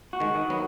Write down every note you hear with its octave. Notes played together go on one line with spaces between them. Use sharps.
F#4
D#3 G#3
D#3
F#3 B3